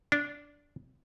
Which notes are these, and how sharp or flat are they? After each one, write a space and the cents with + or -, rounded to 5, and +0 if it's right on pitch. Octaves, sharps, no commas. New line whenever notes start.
D4 -10